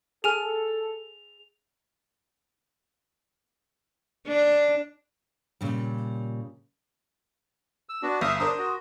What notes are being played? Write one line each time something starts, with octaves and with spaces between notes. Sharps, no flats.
G#4 A4 G#5 F6 F7
D4
A#2 C#3 G3
E6
B3 D4 F#4
G1 E5 F5 D#6
D4 A#4 C5 D#6
F#4